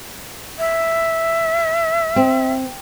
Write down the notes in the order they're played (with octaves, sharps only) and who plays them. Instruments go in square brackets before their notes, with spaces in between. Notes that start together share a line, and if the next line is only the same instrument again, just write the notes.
[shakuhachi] E5
[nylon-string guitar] C4